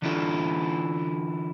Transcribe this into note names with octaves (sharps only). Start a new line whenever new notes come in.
D3 E3 D4 E4 F4 A4